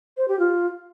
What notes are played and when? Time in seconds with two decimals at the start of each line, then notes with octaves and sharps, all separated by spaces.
0.17 C5
0.28 G4
0.39 F4